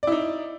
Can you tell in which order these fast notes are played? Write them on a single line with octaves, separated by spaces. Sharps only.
D5 E4 D#4